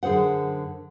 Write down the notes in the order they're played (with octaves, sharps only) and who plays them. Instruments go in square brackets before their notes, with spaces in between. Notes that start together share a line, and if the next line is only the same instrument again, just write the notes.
[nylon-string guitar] F#2 D3 G#4 C5 F#5